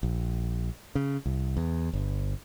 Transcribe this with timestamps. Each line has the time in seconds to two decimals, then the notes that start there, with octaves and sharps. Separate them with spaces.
0.03 A#1
0.95 C#3
1.26 C2
1.57 E2
1.93 G1